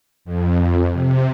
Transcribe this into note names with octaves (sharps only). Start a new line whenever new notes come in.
F2
C3